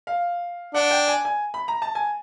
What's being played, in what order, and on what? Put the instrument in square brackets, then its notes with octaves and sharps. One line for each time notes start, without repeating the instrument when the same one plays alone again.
[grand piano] F5
[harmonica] D4 [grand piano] F#5
[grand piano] G5
G#5
G#5
B5
A#5
A5
G#5